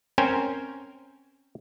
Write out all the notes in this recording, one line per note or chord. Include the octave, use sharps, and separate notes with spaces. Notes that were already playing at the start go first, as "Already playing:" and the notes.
C4 C#4 A#4 C5 G5 G#5